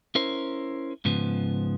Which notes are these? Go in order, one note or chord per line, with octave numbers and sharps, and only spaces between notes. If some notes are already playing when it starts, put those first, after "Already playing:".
C#4 E4 A#4 C5
G#2 C#3 F3 B3